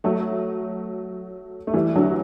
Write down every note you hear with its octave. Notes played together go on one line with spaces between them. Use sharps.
F#3 A3
A3
E3 G3
D3 F#3